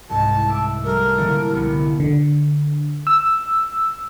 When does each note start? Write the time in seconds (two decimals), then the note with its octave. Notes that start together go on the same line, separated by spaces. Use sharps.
0.09 C2 G#2 A5
0.48 E5 D6
0.84 G3 A3 A#4
1.18 A#2 D3 E3
1.52 C2 G3 B3
2.00 D3
3.07 E6